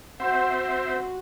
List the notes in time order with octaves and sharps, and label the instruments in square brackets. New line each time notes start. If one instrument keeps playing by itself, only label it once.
[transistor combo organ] C4 C5 E5 [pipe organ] F#4 [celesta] F#5 C6 G6